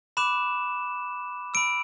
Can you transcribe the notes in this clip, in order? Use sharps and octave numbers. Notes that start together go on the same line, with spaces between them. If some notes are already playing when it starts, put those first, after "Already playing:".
B5 D6 F#6 E7
B5 E6 D7